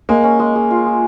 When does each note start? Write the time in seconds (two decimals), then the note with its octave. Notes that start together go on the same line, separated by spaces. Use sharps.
0.09 G#3 A#3
0.24 C#4
0.39 G#3
0.55 G#3
0.71 F4
0.86 G#3